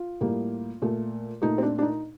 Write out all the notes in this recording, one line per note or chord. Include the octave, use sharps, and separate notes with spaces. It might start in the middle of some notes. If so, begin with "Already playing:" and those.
Already playing: F4
A2 G3 A#3
A#2 A3
A#2 A3 D#4
C4
D4
D4
D#4